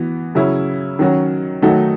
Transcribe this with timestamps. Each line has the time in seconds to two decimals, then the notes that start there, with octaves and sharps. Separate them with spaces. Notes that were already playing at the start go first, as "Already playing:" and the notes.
Already playing: E3 B3 F#4
0.35 C#3 F#3 C#4 E4
0.99 D#3 F#3 C#4 F#4
1.62 D#3 F#3 A3 D#4 F#4